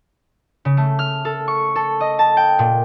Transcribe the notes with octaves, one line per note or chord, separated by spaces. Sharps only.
C#3
A3
F6
A4
C#6
A4
D#5
A5
G5
A#2